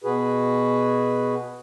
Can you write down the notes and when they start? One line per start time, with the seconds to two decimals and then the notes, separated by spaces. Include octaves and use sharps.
0.04 B2 F#4 G#4 B4